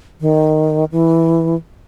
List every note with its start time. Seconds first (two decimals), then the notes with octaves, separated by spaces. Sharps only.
0.21 D#3
0.92 E3